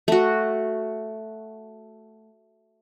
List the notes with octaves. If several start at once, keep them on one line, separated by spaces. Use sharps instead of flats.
A3 F#4